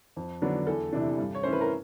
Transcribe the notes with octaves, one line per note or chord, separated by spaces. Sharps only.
F2
D3 F#3 B3 D4
E2 A4
C3 E3 A3 D4
G2
C#5
E3 A3 C#4 C5
B4
A#4